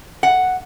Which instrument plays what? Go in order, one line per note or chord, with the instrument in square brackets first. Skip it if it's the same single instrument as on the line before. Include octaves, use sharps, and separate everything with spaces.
[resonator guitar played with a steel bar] F#5